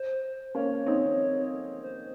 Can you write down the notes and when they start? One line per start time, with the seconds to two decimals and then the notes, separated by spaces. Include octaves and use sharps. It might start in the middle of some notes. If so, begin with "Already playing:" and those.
Already playing: C5
0.55 A#3 C#4 C#5
0.86 C4 D#4
1.83 C5